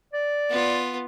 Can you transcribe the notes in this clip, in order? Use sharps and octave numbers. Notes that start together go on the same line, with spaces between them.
D5
B3 F4